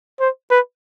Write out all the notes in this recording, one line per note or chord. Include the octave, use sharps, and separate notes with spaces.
C5
B4